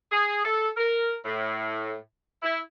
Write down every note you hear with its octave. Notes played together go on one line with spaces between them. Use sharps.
G#4
A4
A#4
A2
E4